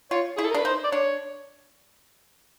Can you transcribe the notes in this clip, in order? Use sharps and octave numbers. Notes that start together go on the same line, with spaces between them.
F4 C#5
E4 G#4
A4
A#4
D4 B4
D#4 C5
D5
D4 C#5